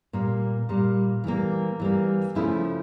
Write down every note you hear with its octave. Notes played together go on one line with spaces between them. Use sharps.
A#2 G3 A#3
A#2 G3 A#3
E3 G3 A#3
E3 G3 A#3
C#3 F3 A3 C#4 E4